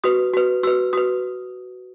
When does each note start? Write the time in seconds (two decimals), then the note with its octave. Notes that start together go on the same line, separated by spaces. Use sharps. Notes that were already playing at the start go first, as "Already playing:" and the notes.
0.04 F#4 B4 D#6
0.33 F#4 B4
0.63 F#4 B4 E6
0.93 F#4 B4 D#6